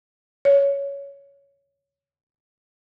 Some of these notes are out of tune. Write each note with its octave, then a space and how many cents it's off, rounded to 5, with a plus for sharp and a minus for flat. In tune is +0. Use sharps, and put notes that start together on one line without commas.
C#5 +10